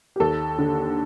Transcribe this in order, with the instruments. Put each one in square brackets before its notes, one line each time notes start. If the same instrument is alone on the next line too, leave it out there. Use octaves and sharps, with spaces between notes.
[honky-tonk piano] G4
D#2 A4
D3